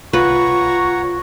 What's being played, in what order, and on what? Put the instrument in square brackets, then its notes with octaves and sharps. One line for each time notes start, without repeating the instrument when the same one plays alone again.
[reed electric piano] C2 F4 [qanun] B4 [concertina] C#5 F#5 A#5 [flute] C#6